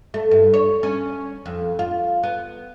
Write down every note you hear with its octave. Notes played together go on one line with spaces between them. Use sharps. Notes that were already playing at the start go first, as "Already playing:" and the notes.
A3
G2
C#5
C#4
F2
F4
B3